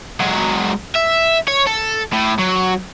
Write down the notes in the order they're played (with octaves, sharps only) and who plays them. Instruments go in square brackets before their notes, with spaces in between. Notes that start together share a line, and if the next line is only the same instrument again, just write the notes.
[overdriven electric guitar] F#3 G#3
E5
C#5
A4
A2
F#3